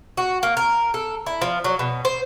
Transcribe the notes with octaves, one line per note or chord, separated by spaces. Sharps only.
F#4
A#3
A#4
A4
E4
F3
F#3
B2
C5